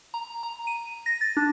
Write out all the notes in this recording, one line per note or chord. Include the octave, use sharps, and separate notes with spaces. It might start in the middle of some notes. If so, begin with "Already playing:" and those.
A#5
A#5
D#7
A#6
A6
D4